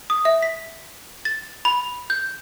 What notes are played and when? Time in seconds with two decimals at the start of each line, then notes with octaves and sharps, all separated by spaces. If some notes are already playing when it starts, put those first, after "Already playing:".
0.10 D#6
0.25 E5
0.42 B6
1.25 A6
1.65 B5
2.10 G6